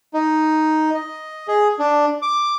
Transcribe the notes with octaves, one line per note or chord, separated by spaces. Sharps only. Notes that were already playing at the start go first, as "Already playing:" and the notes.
D#4
D#5
G#4
D4
D6